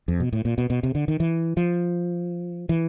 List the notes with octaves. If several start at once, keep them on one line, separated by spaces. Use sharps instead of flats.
F2
B2
A2
A#2
B2
B2
C3
D3
D#3
E3
F3
E3